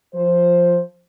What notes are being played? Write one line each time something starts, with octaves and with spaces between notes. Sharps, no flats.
F3 C5